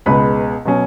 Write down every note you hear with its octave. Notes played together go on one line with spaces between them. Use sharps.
C#2 B2 G#3 B4 B5
B2 F#3 C#4